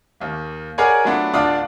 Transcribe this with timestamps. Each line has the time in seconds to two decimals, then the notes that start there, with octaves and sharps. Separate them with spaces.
0.20 D#2 A#3
0.78 G#4 A#4 C#5 D5 F#5 G#5
1.05 F#3 A3 B3 D4 F4
1.33 D1 D3 D4 F4 D5 D#6